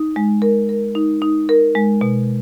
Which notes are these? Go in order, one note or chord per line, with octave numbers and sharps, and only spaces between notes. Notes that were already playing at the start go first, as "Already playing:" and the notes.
Already playing: D#4
G#3
A#4
A#4
D#4
D#4
A#4
G#3
B2